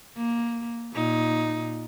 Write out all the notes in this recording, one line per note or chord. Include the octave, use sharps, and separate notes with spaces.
A#3
A#2 D#4